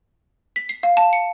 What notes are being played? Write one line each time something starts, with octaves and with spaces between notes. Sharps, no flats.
B6
C7
F5
A5
C#7